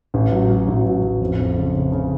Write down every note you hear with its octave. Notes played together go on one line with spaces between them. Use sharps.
A1
F#3
F#3
A1
F#3
A1
F2
F2
C#3
C#3
C#3